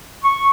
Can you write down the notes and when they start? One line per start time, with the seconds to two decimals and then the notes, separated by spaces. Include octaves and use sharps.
0.24 C#6